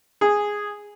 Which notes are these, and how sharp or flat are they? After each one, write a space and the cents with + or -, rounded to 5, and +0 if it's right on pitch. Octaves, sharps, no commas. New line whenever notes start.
G#4 -5